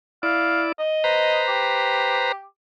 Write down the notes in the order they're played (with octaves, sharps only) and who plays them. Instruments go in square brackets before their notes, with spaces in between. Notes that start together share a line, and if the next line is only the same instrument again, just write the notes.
[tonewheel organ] E4 D5 [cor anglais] F5
[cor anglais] D#5
[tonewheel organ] B4 C5 A#5
[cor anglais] G4